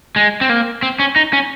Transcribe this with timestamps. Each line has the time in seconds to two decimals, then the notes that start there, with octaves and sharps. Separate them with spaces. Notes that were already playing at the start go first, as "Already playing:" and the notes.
0.16 G#3
0.41 C4
0.50 A#3
0.83 C4
0.99 C#4
1.16 D#4
1.33 C#4